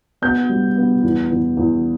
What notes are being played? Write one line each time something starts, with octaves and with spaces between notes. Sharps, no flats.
B3 G6
G3
B3
E2
E2
E2